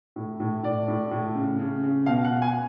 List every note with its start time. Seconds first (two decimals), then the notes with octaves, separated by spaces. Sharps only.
0.16 A2
0.40 A2
0.63 A2 D5
0.88 A2
1.11 A2
1.35 C#3
1.59 C#3
1.83 C#3
2.06 B2 F5
2.24 F#5
2.31 B2
2.42 G#5